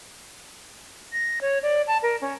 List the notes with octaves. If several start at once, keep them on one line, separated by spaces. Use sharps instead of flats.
A#6
C#5
D5
A5
A#4
C#4